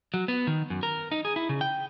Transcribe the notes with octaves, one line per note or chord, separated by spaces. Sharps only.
F#3
B3
D#3
F#2
A#4
D#4
G#4
E4
C#3
G5